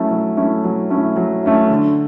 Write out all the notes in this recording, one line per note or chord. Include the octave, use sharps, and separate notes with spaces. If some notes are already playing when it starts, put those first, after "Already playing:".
Already playing: F#3 A3 C#4 E4
F#3
A3 C#4 E4
F#3
A3 C#4 E4
F#3
A3 C#4 E4
D3